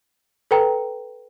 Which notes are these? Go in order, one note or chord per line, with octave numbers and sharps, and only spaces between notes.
A4 B4 G5 A#5